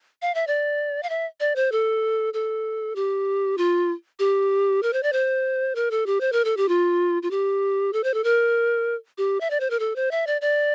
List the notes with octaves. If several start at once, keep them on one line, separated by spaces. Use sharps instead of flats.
F5
E5
D5
F5
E5
D5
C5
A4
A4
G4
F4
G4
A#4
C5
D5
C5
A#4
A4
G4
C5
A#4
A4
G4
F4
F4
G4
A4
C5
A4
A#4
G4
E5
D5
C5
A#4
A4
C5
E5
D5
D5